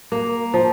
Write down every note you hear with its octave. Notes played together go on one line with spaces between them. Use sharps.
A#3
F3